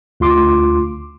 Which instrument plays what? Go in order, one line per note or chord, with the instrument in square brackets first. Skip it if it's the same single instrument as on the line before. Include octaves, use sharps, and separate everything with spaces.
[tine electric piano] D2 F4 C6 D6